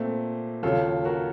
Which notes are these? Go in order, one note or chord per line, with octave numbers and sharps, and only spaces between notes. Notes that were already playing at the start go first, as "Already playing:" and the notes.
Already playing: A#2 A3 C4
D#2 C#3 F#3 F4 A4
F#4 A#4